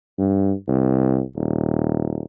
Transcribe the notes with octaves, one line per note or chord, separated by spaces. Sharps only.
G2
C2
D#1